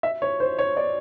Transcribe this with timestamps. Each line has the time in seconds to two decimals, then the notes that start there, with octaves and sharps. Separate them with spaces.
0.03 E5
0.22 C#5
0.40 C5
0.58 C#5
0.77 D5